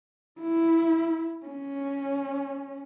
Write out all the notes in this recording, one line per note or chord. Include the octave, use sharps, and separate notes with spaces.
E4
C#4